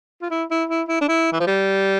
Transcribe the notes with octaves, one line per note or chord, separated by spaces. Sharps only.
F4
E4
E4
E4
E4
D4
E4
E3
F3
G3